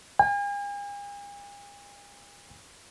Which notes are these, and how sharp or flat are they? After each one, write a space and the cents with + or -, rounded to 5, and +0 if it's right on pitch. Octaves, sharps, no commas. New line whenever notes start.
G#5 -45